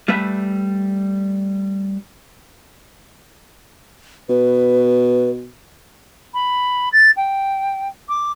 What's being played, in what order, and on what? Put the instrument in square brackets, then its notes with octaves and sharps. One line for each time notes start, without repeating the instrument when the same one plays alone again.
[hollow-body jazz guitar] G3 A3 B4 E5
[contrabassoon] B2 [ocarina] B4
[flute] B5
A6
G5
D6